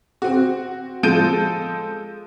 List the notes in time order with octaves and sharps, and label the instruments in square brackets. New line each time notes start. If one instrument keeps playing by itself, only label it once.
[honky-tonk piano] C4 F#4
F3 G#3 A4 G6 D7 D#7